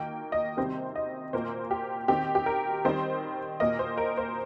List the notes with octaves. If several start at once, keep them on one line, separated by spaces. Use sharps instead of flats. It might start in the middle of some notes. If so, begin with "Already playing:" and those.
Already playing: D#3 A#3 G5
D#5
C3 D#3 G3 C4 C5
D#5
A#2 A#3 C5
G4
D#3 C4 G4
G4
A#4
D#3 G3 C4 C5
A#2 A#3 D#5
C5
A#4
C5